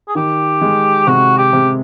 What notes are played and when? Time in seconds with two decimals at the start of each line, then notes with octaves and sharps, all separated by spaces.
0.08 G#4
0.15 D#3 G4
0.62 G#3
1.07 C3 F#4
1.38 G4
1.53 C3